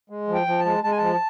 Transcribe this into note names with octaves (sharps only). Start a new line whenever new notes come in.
G#3
F3
G5
F3
A5
G#3
G#3 A5
G#5
F3 A5